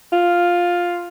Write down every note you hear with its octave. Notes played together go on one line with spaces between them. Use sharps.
F4